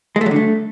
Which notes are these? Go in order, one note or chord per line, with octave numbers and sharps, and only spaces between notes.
G#3
A3
F#3
D3
A3